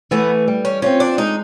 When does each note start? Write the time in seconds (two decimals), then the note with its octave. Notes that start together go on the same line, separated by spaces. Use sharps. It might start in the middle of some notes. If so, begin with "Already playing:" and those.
0.11 E3 A3 B3
0.48 G3
0.65 C#4
0.82 C4 C#4 F4
1.00 D4
1.18 G#3 D#4